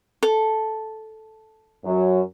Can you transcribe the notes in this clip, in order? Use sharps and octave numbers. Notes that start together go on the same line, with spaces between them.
A4
F#2 F#3